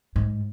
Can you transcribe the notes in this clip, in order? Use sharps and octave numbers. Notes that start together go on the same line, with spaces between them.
G#2